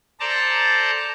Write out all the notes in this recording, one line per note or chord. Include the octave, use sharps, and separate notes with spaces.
A4 C5 D5 A5 A#5